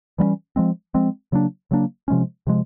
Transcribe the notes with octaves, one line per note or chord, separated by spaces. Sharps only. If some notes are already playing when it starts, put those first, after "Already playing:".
E3 G3 A#3 C#4
F3 G#3 C4
F3 G#3 C4
C#3 F#3 A#3 D4
C#3 F#3 A#3 D4
C3 F3 G#3 C#4
C3 F3 G#3